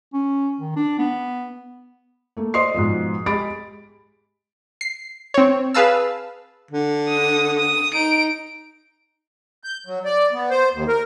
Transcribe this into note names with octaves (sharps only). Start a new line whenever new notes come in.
C#4
D#3
D4
B3
A3 A#3
C5 D5 D#5 C6 D#6 C7
G#2 B2 F3
G#3 G4 B5 A6 D7
C7
C4 C#5
G#4 B4 F5 A5 E6
D3
D#6
D#6
D#4 D7
G6
F#3
D5
B3
C5
D#2
A#4